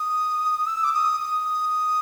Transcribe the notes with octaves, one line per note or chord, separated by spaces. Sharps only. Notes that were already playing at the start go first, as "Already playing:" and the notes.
Already playing: D#6
E6
D6
D#6
D#6